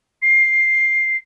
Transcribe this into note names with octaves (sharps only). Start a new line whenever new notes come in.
C7